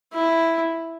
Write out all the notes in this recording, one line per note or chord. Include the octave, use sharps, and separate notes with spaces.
E4